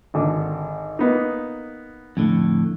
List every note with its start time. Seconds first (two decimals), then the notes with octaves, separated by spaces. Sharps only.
0.14 G#1 D3
0.99 A#3 B3 D#4
2.17 F2 A2 D3